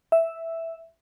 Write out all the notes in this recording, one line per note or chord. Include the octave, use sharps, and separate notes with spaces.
E5